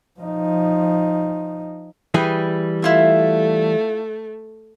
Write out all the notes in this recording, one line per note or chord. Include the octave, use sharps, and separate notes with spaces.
F3 D#4
E3 G3 G#4
A3 E4 F4 E5